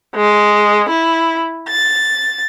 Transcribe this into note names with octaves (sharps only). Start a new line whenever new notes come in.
G#3
E4
A6